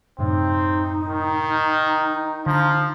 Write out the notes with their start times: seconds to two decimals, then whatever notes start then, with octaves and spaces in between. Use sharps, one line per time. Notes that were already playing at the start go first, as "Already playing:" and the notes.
0.19 F#2 A2 C3 C4 D#4
1.09 D#3
2.46 D3 F3 A#5